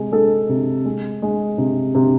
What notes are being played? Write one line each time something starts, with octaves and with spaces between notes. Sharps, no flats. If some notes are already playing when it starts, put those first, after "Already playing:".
Already playing: C3 G#3
G#3 A4
C3
G#3
G#3
C3
C3